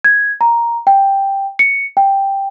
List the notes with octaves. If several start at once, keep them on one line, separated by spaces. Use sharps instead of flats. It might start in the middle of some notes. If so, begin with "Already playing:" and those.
G#6
A#5
G5
C#7
G5